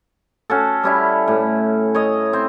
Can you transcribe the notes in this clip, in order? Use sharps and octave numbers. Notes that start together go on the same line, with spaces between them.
C#4 F#4 A4
G3 C#4 E4
A2
C#5 D#5
C4